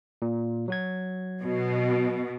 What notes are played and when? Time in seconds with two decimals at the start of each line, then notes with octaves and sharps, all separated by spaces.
0.22 A#2
0.68 F#3 F#4 G#6
1.42 B2